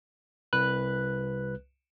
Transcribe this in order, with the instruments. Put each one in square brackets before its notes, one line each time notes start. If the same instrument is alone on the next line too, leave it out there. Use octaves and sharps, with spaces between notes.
[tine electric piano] C2 B4 F#6